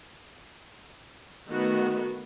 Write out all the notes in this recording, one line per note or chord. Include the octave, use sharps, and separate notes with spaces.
D#3 A3 B3 F#4